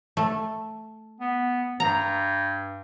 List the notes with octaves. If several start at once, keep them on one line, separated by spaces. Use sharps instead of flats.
A3
B3
G2 A#5